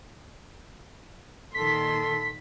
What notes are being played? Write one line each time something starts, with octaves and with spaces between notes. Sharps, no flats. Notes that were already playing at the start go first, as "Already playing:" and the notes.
A#2 D#3 A4 C6 B6